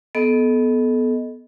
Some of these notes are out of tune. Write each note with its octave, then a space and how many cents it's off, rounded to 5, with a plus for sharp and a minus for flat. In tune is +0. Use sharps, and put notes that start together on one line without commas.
B3 +0 A4 -30 D#5 +5